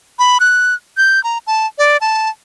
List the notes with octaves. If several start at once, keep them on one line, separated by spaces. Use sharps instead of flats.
B5
F#6
G6
A#5
A5
D5
A5